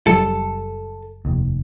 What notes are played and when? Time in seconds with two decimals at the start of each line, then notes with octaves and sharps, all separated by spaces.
0.07 F#1 F#3 G3 A4
1.25 F1 D#2